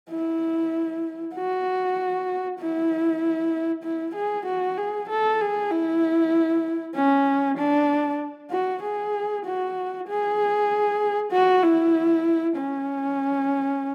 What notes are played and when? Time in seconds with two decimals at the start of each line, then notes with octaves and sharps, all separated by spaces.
0.10 E4
1.36 F#4
2.59 E4
3.84 E4
4.15 G#4
4.46 F#4
4.77 G#4
5.09 A4
5.41 G#4
5.71 E4
6.95 C#4
7.58 D4
8.51 F#4
8.83 G#4
9.45 F#4
10.08 G#4
11.32 F#4
11.63 E4
12.57 C#4